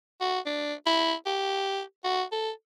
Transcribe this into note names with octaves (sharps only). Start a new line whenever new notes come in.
F#4
D4
E4
G4
F#4
A4